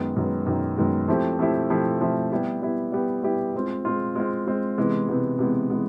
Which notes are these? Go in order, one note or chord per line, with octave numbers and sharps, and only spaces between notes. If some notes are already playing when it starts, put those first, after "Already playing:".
Already playing: F#2 D#3 G#3 B3
F#2 D#3 G#3 B3
F#2 D#3 G#3 B3
F#2 D#3 G#3 B3
F3 A3 C4 E4 G4
F3 A3 C4 E4 G4
F3 A3 C4 E4 G4
F3 A3 C4 E4 G4
G3 B3 E4 G4
G3 B3 E4 G4
G3 B3 E4 G4
G3 B3 E4 G4
G#3 C4 F4
G#3 C4 F4
G#3 C4 F4
G#3 C4 F4
C3 E3 G#3 B3
C3 E3 G#3 B3
C3 E3 G#3 B3
C3 E3 G#3 B3